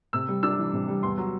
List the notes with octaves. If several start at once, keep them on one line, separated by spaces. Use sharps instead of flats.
C3 E6
G3
D4 E6
E3
C3
G3
E2 C6
F#3